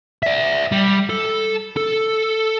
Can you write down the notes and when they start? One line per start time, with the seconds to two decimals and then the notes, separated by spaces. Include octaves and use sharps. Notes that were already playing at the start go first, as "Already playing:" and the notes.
0.23 D5 E5
0.72 G3
1.10 A4
1.77 A4